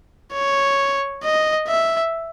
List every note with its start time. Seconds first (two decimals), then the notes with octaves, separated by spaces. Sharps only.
0.33 C#5
1.23 D#5
1.68 E5